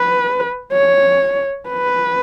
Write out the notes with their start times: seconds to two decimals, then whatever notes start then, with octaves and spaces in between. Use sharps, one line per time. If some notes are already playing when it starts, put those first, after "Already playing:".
Already playing: B4
0.73 C#5
1.69 B4